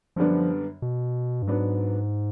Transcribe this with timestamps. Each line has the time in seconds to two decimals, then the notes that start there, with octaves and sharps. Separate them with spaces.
0.16 F#2 D3 F3 G3 B3 D4
0.82 B2
1.42 G2
1.47 G#2 F#3 B3 D4